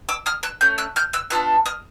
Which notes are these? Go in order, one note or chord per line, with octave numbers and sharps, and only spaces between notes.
D6 E6
D#6 F6
E6 F#6
A3 C#4 G6
E6 F#6
F6 G6
E6 F#6
B3 D4 F4 A4 E6 F#6
D#6 F6